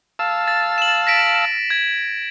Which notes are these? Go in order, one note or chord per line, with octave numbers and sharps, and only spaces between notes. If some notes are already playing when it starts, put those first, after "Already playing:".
F5 A5 E6
A6
E7 F#7
A#6 B6 D7
G#6